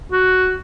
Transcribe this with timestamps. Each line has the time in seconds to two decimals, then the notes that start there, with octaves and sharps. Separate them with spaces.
0.12 F#4